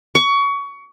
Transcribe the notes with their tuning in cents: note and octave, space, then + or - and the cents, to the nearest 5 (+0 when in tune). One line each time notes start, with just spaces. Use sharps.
C#6 +25